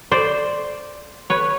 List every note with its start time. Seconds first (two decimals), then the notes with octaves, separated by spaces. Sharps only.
0.11 C5 D5
1.30 B4 C#5